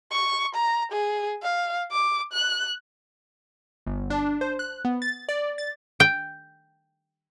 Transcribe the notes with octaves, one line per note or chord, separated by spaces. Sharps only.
C#6
A#5
G#4
F5
D6
F#6
G1
D4
C5
F#6
B3
A6
D5
A6
G5